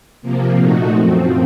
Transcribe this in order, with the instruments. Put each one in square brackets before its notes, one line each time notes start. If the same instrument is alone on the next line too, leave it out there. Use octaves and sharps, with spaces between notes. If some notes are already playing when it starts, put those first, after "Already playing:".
[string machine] C3 F3 A#3
A#2 A3 D#4 F#4
F#2 F3 C4